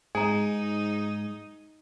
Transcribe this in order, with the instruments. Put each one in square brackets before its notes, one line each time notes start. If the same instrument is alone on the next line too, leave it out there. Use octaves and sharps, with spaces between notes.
[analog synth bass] G#2 [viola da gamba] D#4 [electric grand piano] G#4 [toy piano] G#5 A#5